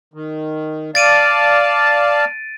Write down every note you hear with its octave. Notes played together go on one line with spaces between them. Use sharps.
D#3
D5 F5 A5 A6 D7 D#7